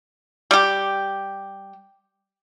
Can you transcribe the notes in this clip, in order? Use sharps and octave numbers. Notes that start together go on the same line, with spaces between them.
G3 G4